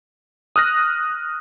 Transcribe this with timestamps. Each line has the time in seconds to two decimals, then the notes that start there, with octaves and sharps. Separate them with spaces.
0.56 D#6 F6 F#6 A#6